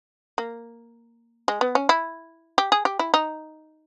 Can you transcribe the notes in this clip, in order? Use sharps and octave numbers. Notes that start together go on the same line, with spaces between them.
A#3
G#3
B3
C#4
E4
G4
G#4
G4
E4
D#4